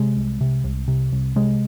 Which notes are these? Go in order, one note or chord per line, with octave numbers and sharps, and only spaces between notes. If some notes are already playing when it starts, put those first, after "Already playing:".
Already playing: C3 G#3
C2
C3
C2
C3
C2
C3 G#3